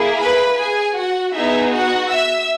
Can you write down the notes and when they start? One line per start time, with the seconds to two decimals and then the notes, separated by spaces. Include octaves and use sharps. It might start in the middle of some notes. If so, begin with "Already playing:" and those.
Already playing: A#3 E4 G#4
0.20 B4 B5
0.58 G#4 G#5
0.96 F#4 F#5
1.34 B3 D#4 E4 G#4 E5
1.72 F#4 F#5
2.10 E5 E6